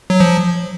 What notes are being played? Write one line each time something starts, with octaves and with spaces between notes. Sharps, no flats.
F#3
F3